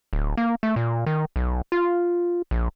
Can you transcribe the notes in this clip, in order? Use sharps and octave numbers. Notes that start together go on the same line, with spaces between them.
D1
A#3
A3
A#2
D#3
B1
F4
A#1